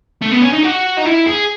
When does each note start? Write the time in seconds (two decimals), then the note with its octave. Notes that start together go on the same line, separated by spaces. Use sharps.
0.22 A3
0.32 B3
0.42 C#4
0.53 D#4
0.64 F#4
0.98 D#4
1.06 E4
1.27 G#4